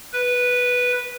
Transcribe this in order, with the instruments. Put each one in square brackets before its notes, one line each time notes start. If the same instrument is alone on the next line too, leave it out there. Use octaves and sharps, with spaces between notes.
[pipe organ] B4